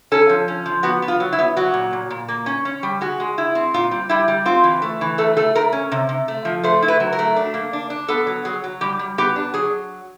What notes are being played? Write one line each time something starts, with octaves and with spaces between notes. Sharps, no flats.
C#4 A4
F3
C#4
F3
B3 F#4
B3
F4
F#3
E4
B3
F#3 F#4
A#2
A#2
A#2
A#3
C#4
C#4
G3
G#3 F#4
G#3
E4
C4
A#2 F4
G3
G3 E4
G3
C4 F4
E3
A3
E3
A3 A4
A3 A4
A3 A#4
C#4
C3
C3
A3
F3
A3 C5
E4
B4
F#3
A#4
A3
D4
A#3
D4
D4
B3 A4
F#3
F#3 G#4
F#3
G3 G4
G3
B3 G4
D4
F#3 G#4